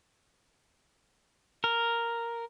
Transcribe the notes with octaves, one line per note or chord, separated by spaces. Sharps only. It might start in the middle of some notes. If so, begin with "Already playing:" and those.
A#4